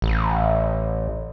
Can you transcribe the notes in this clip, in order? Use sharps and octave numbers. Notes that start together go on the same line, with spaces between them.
A1